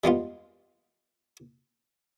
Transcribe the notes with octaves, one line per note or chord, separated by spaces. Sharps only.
G3 G#3 B3 F4